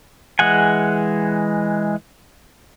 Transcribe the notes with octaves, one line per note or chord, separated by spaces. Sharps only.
E3 G#3 G#4 F#5 G#5